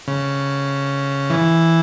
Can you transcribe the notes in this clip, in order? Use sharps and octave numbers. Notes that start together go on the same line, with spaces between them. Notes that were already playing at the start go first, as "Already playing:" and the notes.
C#3
E3